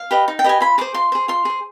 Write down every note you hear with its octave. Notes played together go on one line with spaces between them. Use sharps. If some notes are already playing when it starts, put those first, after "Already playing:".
Already playing: F5
G4 B4 D#5
D#4
G5
G4 B4 D#5 G#5
F4 B5
G#4 C5 D6
F4 C6
G#4 C5
F4 C6
G#4 C5